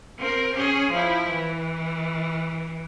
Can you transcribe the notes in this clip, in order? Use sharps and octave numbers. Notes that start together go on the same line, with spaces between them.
C4 A#4
C#4 G#4
F3 E4
E3